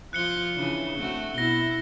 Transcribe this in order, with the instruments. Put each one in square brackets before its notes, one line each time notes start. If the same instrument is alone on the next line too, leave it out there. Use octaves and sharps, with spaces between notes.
[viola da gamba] F3 F4 [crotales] F#6 C#7 G7
[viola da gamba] C#3 E3 D4
A3 C4 F#4
[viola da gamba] B2 E4 [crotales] A#6 G7